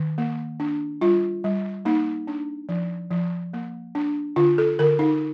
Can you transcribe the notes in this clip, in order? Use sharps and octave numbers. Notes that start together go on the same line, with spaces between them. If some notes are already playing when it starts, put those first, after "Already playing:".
Already playing: D#3
A#3
D4
G3 F4
G3
A#3 D#4
D4
F3
F3
A#3
D4
D3 F4
A4
D3 A#4
D#4